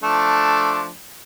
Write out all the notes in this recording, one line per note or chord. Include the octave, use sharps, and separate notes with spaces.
F3 A3 D4